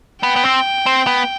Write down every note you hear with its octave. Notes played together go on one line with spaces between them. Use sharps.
B3 G5
B3
C4
C4
B3